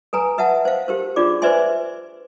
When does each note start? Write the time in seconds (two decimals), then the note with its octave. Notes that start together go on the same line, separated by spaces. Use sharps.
0.13 A4 B4 G#5 A#5
0.38 B4 E5 F#5 A5
0.65 C5 F5
0.88 G4 A#4 C5
1.16 D4 F4 G#4 D5 D6
1.42 B4 C5 D5 E5 G#5 C6